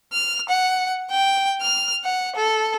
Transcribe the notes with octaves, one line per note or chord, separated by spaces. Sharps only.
F6
F#5
G5
F6
F#5
A4